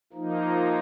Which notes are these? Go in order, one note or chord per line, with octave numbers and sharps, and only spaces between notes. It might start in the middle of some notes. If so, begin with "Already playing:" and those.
F3 A#3 D#4